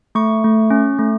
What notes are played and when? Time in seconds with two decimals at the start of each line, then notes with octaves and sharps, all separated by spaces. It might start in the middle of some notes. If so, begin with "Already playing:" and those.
0.15 A3 C#6
0.44 A3
0.70 C#4
0.99 A3